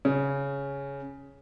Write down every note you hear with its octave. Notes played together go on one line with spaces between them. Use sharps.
C#3